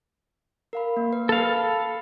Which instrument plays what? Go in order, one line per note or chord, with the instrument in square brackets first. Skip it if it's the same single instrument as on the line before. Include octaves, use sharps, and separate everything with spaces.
[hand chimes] A#4 F5 B5
A#3
B4
[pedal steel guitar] A4 F5 [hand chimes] B5